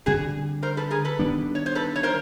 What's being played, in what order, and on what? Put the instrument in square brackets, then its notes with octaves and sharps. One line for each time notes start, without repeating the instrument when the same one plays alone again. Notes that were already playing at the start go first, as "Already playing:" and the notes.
[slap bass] D3 G3 C4 [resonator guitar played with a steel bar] F#4 G#4
[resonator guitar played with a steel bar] A#4 C5
A4 B4
G#4 A#4
A4 B4
[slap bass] D#3 G3 B3 D4
[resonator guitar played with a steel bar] C#5
C5
A4 B4
C#5
A#4 C5